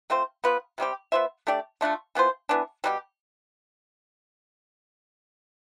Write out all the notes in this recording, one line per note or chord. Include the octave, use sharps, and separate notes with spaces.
A3 C4 F4 C5
F3 B3 F4 B4
C3 G3 C4 G4
B3 F4 C5 E5
A3 D4 G4 D5
D3 A3 D4 F4
E3 B3 F4 C5
E3 B3 D4
B2 G3 D4 G4